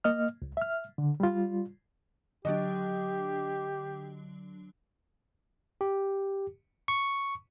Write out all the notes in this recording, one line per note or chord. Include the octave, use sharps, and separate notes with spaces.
A#3 D#5 F6
C#2
E5 F6
D3
G3 F4
D3 F#3 D4 G4 D#5
G4
C#6